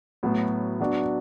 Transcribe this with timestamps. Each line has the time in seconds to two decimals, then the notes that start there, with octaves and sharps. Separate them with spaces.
0.23 A2 F#3 B3
0.80 F#3 B3 D4 F#4